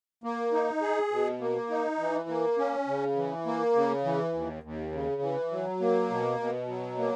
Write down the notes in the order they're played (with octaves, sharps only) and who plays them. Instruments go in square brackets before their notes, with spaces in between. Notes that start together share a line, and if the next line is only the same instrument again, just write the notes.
[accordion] A#3
D#4
G#4
B2
A#3
D#4
E3
A#3
C#4
C#3
E3
A#3
C#3
E3
D#2
D#2
C#3
E3
F#3
A#3
B2
B2
F#3
A#3